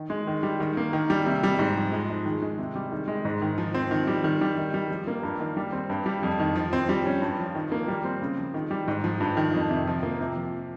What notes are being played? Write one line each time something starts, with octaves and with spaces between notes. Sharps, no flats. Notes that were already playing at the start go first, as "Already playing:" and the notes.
Already playing: D#3
G#3
D#3
G3
D#3
A#3
D#3
G3
C3
G3
G#2
F3
G#3
D#4
D#3
G#3
C3
G3
D#3
G#3
G#2
D#3
F3
C4
D#3
G3
D#3
G3
D#3
G3
F3
A#3
G2
D#3
G3
C4
G2
G3
F2
D#3
F3
C4
G3
C#4
G2
F3
D#3
A#3
G3
C4
C#3
F3
D#3
G3
G#2
F3
G2
D#3
F2
C3
F3
A#3
C3
F3